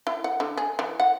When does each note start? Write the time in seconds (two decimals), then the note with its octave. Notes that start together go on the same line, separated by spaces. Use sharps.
0.07 E4
0.24 F#5
0.40 D3
0.57 G#4
0.79 E3
1.00 F#5